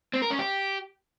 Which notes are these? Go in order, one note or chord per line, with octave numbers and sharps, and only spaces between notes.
C4
A#4
C#4
G4